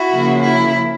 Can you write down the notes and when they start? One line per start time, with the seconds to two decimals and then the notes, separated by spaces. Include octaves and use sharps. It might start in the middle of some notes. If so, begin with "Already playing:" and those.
Already playing: E4 F#4
0.12 C#3 F3 A#3
0.42 E4